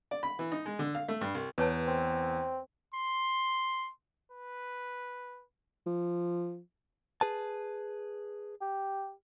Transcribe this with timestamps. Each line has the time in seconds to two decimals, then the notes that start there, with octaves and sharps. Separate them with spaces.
0.11 D5
0.23 B5
0.39 E3
0.52 D#4
0.66 G#3
0.79 D3
0.95 F5
1.08 A3
1.21 G2
1.34 C2
1.58 E2 B4 C#5 A5
1.87 C4
2.94 C6
4.32 B4
5.87 F3
7.21 G#4 B4 A5
8.61 G4